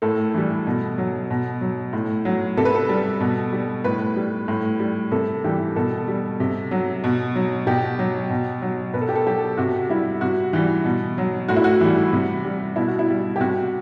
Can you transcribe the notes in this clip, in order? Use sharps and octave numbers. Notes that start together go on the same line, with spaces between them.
A2 A4
E3 G3
B2
F#3
B2
F#3
A2
F#3
C3 A4
B4
A4
G3
B2
G3
A2 B4
G3
A2
G3
C3 A4
E3 G3 G4
B2 A4
G3
C3
F#3
B2
F#3
B2 G4
F#3
B2
F#3
B2 B4
A4
G4
A4
F#3 G4
C3 F#4
G3 E4
C3 F#4
E3 G3
B2
F#3
A2 F#4
E4
F#4
E3 G3
C3
G3
B2 E4
F#4
E4
G3
G4
C3 F#4